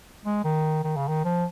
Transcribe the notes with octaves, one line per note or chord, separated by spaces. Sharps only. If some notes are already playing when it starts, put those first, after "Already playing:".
G#3
D#3
D#3
C#3
D#3
F3